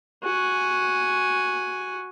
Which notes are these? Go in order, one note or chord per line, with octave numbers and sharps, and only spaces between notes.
F#4 G#5